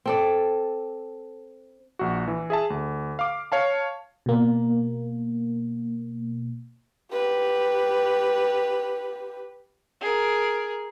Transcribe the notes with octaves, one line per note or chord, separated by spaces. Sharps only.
C4 A4 D5
A#1 F#4
E3
G#4 E5 A5
D2
F5 D6
C#5 F5 A5
B2 A#3
G4 B4
G#4 A#4